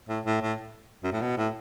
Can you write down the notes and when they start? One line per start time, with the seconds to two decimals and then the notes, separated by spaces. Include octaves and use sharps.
0.09 A2
0.26 A2
0.42 A2
1.04 F#2
1.12 A2
1.21 B2
1.37 A2